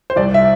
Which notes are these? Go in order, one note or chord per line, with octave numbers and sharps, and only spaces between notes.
C5
C2 D5
E5